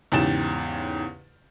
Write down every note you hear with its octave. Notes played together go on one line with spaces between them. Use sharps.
E2 G#2 C#3 G4 A6 E7